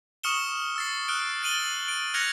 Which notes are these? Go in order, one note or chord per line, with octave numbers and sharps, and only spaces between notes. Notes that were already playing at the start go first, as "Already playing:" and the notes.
C#6 D#6 F6 C#7 E7 G7
E6 A6 C7
D#6 F6 F#6 D7
A6 D7 D#7 F#7 G7
D7
F6 F#6 G#6 A#6 C#7 F7